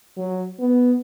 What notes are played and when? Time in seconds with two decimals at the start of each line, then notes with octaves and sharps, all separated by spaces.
0.17 F#3
0.60 B3